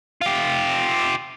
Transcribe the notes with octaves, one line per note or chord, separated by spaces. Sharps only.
F4 G4